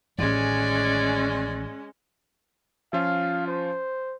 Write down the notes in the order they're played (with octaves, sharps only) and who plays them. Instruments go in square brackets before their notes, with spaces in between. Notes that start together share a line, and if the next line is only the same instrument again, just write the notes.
[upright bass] A1 D#3 [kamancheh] G#3 C#4 [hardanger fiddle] D5
[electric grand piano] F3 C#4 F4 [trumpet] F5
[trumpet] C5